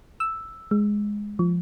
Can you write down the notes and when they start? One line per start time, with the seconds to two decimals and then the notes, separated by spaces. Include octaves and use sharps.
0.20 E6
0.71 G#3
1.39 F3